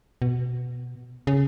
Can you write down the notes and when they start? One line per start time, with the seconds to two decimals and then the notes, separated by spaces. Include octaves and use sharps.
0.22 B2
1.27 C#3